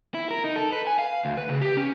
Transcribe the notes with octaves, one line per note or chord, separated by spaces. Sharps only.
E4
A#4
D#4
A4
B4
G#5
F5
D2
B4
C#3
G4
C#4